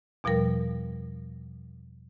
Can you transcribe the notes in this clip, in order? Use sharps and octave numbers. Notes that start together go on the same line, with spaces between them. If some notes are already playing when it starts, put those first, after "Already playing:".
E2 B2 F3 G3 A#4